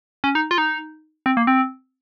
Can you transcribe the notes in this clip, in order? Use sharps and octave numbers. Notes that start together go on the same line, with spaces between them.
C#4
D#4
F4
D#4
C4
A#3
C4